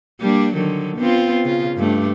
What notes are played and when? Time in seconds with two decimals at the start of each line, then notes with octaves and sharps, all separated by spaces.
0.21 G3 A#3 D4
0.54 D3 D#3 F#3
0.97 B3 C4 F4
1.44 C#3 F4
1.77 G2 A3 D4